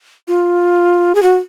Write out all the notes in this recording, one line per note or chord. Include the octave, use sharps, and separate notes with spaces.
F4
G#4
F#4